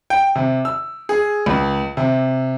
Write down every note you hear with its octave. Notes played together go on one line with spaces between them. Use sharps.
G5
C3
E6
G#4
C#2
C3